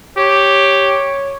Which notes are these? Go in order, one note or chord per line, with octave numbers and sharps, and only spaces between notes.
G4 C#5